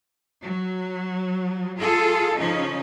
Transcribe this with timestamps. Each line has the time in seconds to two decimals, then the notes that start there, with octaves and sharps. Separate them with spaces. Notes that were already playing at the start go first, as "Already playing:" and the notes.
0.42 F#3
1.78 F4 G#4 A4
2.36 C#3 F3 C#4 D#4